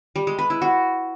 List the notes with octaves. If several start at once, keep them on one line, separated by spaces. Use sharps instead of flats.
G3
G#3
B4
E4
F#4